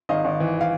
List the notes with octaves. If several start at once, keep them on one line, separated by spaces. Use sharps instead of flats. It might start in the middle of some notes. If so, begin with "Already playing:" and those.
G#1 D#5 F5
G#1
E3
F5